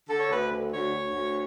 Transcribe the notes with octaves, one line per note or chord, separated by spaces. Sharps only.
D3 A4
C#5
D2 B4
D3
D2 C#5
D2
D2